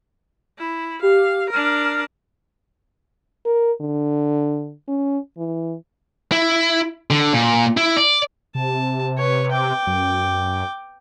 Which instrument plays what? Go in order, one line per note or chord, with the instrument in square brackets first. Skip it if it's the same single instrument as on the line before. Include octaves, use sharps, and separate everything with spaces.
[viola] E4
[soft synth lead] G4 [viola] F5
[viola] D4 A#4 [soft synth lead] F6
[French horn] A#4
D3
C#4
E3
[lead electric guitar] E4
D3
A#2
E4
D5
[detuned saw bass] C3 [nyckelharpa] A5
[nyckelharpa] B4 C#5
G5 D6
[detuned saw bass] F#2